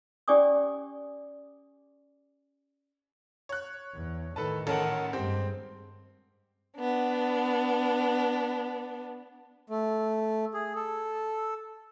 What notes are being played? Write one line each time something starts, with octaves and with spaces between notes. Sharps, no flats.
C#4 G4 D5 G#5 D6 D#6
C#5 F#6
E2
A2 D#3 A4 B4 A5
A1 C#4 A4 A#4 F#5 A5
G2 G#3 C4 G4
B3 D4
A3
G#4
A4